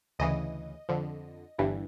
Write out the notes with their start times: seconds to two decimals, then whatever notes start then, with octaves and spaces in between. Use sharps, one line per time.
0.19 D2 C#3 E3 D#5
0.89 F2 D3
1.59 G1 G2 E3